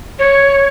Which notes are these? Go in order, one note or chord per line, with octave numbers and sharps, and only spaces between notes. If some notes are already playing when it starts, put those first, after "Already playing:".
C#5